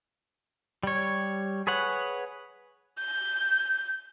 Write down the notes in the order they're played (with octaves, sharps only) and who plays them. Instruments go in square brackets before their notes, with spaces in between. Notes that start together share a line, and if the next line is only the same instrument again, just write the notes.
[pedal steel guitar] G3 C#5
G#4 B4 C#5 F#5
[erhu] G6